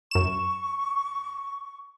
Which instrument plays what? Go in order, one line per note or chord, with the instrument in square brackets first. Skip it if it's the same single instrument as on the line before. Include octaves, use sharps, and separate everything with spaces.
[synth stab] F#2 E7 [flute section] C#6